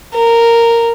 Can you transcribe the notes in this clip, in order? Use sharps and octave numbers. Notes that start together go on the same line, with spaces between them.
A#4